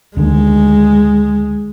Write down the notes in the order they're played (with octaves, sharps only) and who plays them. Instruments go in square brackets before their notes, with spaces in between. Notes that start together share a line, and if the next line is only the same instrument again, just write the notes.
[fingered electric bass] D2 D3 D#3 [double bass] G#3